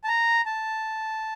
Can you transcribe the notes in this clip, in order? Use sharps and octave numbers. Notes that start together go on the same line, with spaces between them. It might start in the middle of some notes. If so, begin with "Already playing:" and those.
A5
A#5
A5